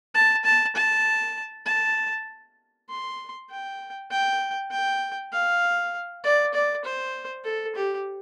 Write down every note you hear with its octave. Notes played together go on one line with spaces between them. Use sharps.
A5
A5
A5
A5
C6
G5
G5
G5
F5
D5
D5
C5
A4
G4